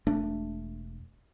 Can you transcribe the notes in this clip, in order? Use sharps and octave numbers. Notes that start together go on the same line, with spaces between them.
E1 A3 D4